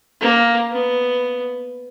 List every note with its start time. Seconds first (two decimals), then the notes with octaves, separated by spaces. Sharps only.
0.21 A#3
0.71 B3